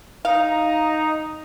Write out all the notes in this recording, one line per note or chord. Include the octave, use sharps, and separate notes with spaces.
D#4 F5 A#5